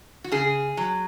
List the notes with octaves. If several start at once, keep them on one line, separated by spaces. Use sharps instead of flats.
F#4
C#3 G#4
F#3